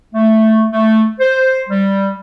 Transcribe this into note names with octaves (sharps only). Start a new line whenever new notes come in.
A3
A3
C5
G3